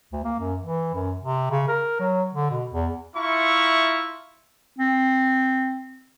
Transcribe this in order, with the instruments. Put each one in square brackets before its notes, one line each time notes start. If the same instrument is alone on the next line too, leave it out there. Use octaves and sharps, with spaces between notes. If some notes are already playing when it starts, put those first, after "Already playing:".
[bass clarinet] D2
A#3
F#2
E3
F#2
C3
C#3
A#4
F#3
D3
B2
E2
[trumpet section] E4 F4 E5 A#5 C#6
[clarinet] C4